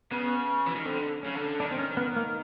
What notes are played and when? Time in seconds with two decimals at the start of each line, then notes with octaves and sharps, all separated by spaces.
0.11 C#3 B3
0.66 E3
0.75 D#3
0.85 D3 C4
1.23 C#3 C#4
1.35 D3
1.60 D#3 D4
1.71 C4
1.79 C#4
1.97 B3
2.16 A#3